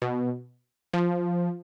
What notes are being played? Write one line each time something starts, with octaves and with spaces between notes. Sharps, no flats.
B2
F3